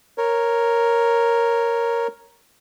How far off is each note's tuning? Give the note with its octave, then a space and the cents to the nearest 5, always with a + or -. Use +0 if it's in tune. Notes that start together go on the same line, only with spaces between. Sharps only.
A#4 +0 C#5 -5